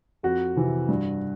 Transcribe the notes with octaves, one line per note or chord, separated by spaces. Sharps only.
F2 F#4
C3 E3
G2